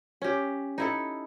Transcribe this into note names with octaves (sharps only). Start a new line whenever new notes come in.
C#4 G4
D#4 E4 A4